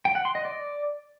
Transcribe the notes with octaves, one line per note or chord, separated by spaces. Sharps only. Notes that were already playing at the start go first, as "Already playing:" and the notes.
G5
F#5
C6
D#5
D5